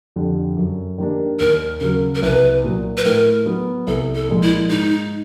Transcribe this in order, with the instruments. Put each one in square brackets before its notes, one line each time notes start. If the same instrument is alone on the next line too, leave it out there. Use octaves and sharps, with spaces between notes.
[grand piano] F2 D3 G3
F#2
D#3 G3 A#3 D4
[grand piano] D#2 [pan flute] A#4
[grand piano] C#3 F#3 [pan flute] A#4
[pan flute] A#4
[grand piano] C2 [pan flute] B4
[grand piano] A#2 F#3
[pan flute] B4
[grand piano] A2 [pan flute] A#4
[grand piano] F#3 B3
[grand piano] C2 [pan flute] A4
[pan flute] A4
[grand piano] A#2 F3 G#3
[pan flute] E4
[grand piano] G#2 [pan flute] D#4